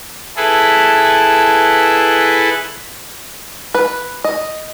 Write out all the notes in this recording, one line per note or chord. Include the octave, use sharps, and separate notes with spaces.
E4 G#4 A4 B4
B4
D#5